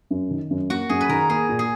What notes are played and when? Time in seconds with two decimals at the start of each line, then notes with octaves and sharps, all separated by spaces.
0.11 F#2
0.30 D#3
0.51 F#2
0.70 A#3 F#4
0.89 F#2 G#4
1.01 B4
1.09 D#3 A#4
1.29 A#3 G#4
1.49 A#2
1.59 G#4